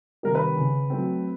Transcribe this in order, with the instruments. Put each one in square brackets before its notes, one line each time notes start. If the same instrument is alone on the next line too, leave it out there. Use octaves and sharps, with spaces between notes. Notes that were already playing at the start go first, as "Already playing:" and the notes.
[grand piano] C3 D#3 G3 A#4
B4
C#3
F#3 A3 C4